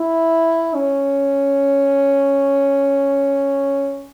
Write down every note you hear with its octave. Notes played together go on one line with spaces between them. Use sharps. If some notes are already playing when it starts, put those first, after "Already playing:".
Already playing: E4
C#4